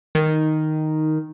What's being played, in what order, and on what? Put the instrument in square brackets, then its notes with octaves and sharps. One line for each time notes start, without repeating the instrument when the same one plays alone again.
[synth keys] D#3